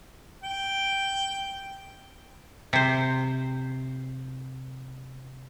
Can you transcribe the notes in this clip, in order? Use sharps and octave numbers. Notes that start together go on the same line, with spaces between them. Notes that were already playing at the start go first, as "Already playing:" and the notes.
G5
C3 C5